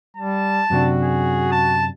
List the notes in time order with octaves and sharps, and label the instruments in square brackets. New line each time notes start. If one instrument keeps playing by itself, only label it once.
[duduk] G3 [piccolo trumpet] A5
[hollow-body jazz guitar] F#2 C3 D4 [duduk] F#4
[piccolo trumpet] G#4
A5